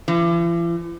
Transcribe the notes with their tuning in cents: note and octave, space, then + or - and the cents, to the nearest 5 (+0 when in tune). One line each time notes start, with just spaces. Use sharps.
E3 +45